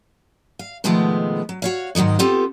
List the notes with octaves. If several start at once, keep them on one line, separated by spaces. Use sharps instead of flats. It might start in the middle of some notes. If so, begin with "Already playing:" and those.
F5
B2 D#3 F3 G#3 A3 B3
F#3
F#4 C#5 F5
G#2 D#3 F3 F#3 D#4
B3 C4 F4 G4 A4